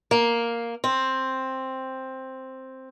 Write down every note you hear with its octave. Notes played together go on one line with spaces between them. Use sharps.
A#3
C4